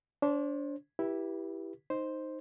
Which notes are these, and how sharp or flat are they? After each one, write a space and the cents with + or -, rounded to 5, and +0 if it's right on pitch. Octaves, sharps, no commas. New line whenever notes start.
D4 -25 C5 +25
E4 +0 G4 +0 B4 -30
D#4 +0 C5 +0